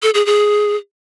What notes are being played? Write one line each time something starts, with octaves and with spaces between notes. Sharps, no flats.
A4
G#4
G#4